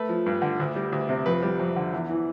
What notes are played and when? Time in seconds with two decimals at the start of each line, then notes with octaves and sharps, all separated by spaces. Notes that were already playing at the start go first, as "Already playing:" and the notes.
Already playing: A3 B4
0.09 F3
0.26 G2
0.42 D3
0.60 D2
0.75 G3
0.92 D2
1.09 C3
1.26 F2 B4
1.42 G3
1.60 F2
1.76 D3
1.93 E2
2.09 E3